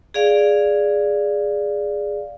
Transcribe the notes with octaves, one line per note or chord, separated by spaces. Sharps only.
G#4 D5 F5